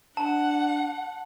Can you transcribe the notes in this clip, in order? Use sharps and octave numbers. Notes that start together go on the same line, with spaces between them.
D4 F#5 A5